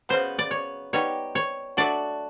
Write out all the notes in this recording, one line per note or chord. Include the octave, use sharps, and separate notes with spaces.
C#3 F#3 B3 C5
D5
C#5
G3 B3 D#4 G4 C#5
C#5
F#3 A3 D4 F#4 D5